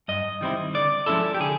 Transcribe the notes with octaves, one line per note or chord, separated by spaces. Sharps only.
G2 D#5
D#3 G3 C4 E4
D3 D5
F3 G#3 C#4 E4 A4
G4
D3 G#4